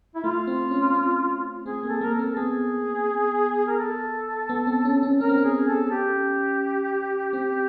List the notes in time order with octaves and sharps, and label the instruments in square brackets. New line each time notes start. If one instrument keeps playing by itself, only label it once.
[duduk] E4
[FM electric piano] A3 [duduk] F4
[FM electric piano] C4
C#4
C4
C#4
[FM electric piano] C4 [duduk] G#4
[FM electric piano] A#3
[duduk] A4
[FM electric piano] A#3 [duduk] A#4
[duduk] A4
[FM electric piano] C4
[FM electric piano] B3 [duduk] G#4
[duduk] A#4
A4
[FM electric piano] B3
C4
C#4
C#4
[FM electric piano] C#4 [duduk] A#4
[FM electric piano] C4
C#4
[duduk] G#4
A4
G4
[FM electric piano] C4